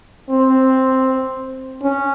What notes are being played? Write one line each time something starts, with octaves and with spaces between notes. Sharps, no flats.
C4
C#4